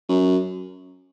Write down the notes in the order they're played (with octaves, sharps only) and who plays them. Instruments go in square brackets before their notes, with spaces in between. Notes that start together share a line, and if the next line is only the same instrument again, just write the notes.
[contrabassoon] F#2